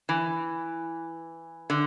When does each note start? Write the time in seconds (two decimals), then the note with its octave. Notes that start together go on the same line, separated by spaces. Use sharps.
0.09 E3
1.70 D3